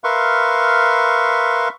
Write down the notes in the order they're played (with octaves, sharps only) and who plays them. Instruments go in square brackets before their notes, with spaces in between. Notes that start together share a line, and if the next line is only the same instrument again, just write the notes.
[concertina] A#4 B4 E5 F5 C6 C#6